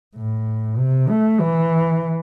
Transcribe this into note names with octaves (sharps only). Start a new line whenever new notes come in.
A2
C3
A3
E3